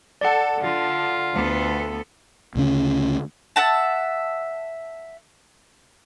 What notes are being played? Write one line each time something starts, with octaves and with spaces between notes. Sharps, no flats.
A4 D5 F#5
D3 F4
D2 B3 A4
D2 C#3 C#4
E5 F#5 A5